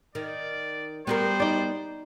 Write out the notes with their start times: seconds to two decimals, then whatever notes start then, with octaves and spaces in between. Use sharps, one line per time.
0.15 D#3 D5
1.07 G3 B3 F#4 A#4 C5
1.40 D#4 D5